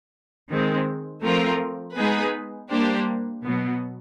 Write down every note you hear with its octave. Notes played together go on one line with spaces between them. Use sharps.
D#3 G#3 C4
F3 A3 C4 F4 A#4
G#3 B3 D#4 G#4 B4
G3 A#3 D4 G4 C5
B2 F#3 B3